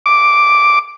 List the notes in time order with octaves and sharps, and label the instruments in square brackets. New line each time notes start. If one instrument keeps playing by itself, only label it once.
[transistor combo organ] D6